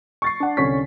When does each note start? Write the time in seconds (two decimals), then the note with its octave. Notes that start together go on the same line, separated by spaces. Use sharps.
0.22 C#6 A6 C7
0.40 D4 F#5
0.57 C2 D3 C#4 C#6 B6